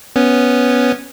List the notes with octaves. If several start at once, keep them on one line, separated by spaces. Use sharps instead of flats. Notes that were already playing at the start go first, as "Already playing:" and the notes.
B3 C#4